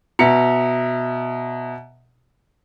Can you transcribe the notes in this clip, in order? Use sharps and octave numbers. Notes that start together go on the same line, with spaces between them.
B2 E5 A#5 C#7